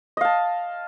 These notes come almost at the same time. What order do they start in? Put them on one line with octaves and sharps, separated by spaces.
D#5 F5 A5